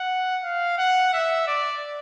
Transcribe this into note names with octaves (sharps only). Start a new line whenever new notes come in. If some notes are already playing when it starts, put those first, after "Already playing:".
Already playing: F#5
F5
F#5
E5
D5